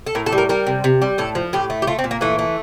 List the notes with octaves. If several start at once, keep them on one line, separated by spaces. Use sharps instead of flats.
A4
A2 A#4
A4
G3
A#4
G3 A#4
C3
C3
G3
A2 A4
F3
A2 G4
A3
G4
A3 F4
C4
A#2
A#3
E3 A3
A3